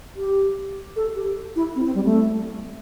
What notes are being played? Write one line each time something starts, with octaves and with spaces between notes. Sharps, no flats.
G4
A4
G4
E4
C4
C4
G3
A3